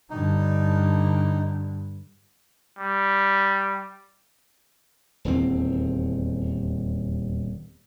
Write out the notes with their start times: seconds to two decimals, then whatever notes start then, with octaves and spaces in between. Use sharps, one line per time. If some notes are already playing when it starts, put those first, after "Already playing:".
0.10 G2 D3 D#4
2.78 G3
5.25 D#1 E2 C4